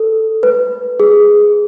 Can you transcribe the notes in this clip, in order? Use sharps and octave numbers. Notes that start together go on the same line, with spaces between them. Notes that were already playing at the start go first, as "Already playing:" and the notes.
Already playing: A4
B4
G#4